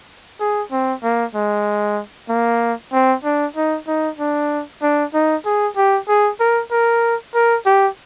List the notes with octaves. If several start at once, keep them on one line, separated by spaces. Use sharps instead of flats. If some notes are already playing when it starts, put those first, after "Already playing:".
G#4
C4
A#3
G#3
A#3
C4
D4
D#4
D#4
D4
D4
D#4
G#4
G4
G#4
A#4
A#4
A#4
G4